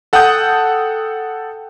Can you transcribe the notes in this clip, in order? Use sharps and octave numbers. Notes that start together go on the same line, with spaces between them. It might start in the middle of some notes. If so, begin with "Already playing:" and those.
A4 F#5 G5 A5 D#6 G6